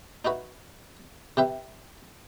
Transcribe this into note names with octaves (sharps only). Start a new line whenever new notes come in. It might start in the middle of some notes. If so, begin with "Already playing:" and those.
D#4 E4 F#4 B4
C3 G4 B4 E5